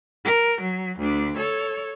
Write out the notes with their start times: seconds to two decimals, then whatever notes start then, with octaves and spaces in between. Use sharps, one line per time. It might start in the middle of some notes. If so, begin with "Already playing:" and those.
0.25 A#4
0.61 F#3
0.99 D2 D4
1.37 A4 C#5